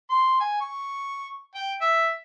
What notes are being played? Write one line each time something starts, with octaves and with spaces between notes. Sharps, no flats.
C6
G#5
C#6
G5
E5